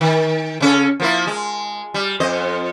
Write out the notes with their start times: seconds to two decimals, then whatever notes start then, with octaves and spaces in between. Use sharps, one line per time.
0.01 D#3
0.60 C#3 C#4 A4
1.00 F3 A#3 E4
1.27 G#3
1.94 G3
2.20 F2 C5 D#5